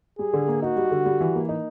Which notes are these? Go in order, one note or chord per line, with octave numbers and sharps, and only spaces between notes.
G3 G#4
D3
A#3
D#4 F#4
G3
D3
G3
E3
A#3
D#4